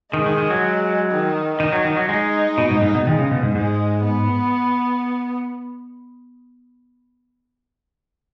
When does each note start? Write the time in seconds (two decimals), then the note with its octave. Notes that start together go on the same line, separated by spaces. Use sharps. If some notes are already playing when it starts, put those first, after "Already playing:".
0.13 D#3 G#3
0.26 D#3
0.38 D#3
0.50 F#3
1.11 D#3
1.60 D#3 D#4
1.73 F#3
1.85 D#3
1.97 F#3
2.09 G#3 D#4
2.58 B2
2.70 G#2
2.82 G#2
2.94 B2
3.07 D#3 G#3
3.19 C#3
3.31 B2
3.43 G#2
3.55 G#2 G#3
4.04 B3